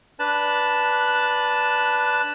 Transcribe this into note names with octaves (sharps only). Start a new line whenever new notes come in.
D4 B4 A5 F#6